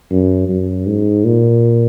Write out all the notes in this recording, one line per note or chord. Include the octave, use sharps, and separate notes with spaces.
F#2
F#2
G#2
A#2